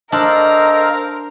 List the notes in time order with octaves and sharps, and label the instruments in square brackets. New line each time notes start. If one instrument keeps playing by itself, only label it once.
[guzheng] D4 [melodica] A4 C5 F5 [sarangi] A#4 [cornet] D#5